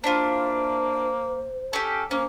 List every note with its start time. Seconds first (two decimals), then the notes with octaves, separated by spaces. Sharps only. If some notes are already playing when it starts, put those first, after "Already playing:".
0.04 A#3 D4 E4 F4 C5
1.73 C#4 G4 A4
2.11 A#3 C#4 C5